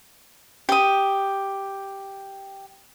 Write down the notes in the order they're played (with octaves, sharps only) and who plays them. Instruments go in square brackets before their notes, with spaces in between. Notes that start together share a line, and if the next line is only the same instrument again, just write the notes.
[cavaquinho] G4 D#6